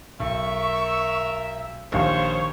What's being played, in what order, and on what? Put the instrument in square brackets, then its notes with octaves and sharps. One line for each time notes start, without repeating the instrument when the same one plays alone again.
[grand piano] B1 [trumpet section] A#4 E5 [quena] C#6
[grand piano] A#1 [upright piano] D#2 F5 C#6 [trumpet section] C5 [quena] C#5